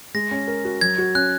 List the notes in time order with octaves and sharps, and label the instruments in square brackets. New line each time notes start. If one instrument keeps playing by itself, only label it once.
[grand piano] G#3 [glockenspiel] A#6
[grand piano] C#4
A#4
F#4
[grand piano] F#3 [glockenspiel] G#6
[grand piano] F#4
[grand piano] C#4 [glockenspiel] F#6